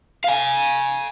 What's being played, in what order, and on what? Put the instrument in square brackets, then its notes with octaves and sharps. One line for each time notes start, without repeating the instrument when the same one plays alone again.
[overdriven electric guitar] F5 G#5